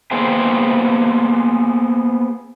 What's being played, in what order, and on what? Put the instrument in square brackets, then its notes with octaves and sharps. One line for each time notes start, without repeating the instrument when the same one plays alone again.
[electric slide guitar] A#3 B3 G#4 C5 G5